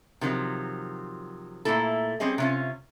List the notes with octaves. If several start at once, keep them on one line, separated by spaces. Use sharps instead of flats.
C3 D#3 F3 F#3
A#2 A3 A#3 E4 A4
G3 C4 C#4 G#4 D#5
C3 C#4 F4